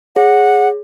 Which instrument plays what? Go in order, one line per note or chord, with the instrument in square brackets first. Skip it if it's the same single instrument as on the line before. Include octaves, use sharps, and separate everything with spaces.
[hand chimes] G#4 C#5 [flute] F#5